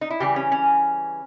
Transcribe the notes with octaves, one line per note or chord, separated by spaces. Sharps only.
D#4
E4
C#3 E3 G3 G4
C#4
C#4